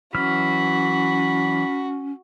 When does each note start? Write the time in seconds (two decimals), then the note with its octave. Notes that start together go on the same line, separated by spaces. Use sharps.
0.15 E3 F#3 C#4 F#4 B5 F6